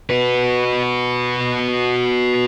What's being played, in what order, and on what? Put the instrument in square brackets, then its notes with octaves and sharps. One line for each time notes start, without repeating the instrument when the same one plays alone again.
[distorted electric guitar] F#4 B4